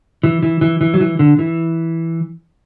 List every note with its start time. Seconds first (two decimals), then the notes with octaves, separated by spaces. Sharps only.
0.23 E3
0.43 E3
0.61 E3
0.81 E3
0.94 F#3
1.00 E3
1.19 D3
1.39 E3